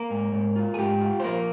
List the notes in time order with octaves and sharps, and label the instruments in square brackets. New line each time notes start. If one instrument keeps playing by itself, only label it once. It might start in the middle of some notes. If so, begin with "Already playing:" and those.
Already playing: [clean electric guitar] A#3 A#4
G#2
G#2
F4
G#4
G#2 G4
F4
C5
F3 A#3 A#4